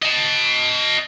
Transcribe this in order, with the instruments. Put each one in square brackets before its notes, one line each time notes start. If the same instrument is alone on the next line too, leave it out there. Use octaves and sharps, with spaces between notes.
[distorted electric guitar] D#5 A5